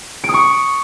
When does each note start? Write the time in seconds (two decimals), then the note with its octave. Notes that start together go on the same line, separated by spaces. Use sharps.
0.24 D7
0.29 D#6
0.34 C#6